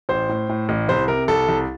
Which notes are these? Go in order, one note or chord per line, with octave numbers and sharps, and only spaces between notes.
A1 C5
A2
A2
A1
C2 C5
C3 A#4
C2 A4
C2